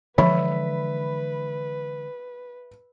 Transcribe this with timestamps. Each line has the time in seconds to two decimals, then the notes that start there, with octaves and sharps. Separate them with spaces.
0.18 D3 E3 F3 G#3 B4 E5 B5